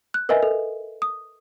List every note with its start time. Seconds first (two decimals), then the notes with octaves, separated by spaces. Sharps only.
0.14 F#6
0.29 A#4 B4 D#5 E5 G#5
0.43 A4
1.02 D#6